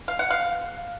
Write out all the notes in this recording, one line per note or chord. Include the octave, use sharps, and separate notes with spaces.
F5
F#5
F5